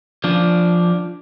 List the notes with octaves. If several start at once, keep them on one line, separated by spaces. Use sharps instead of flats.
F3 D4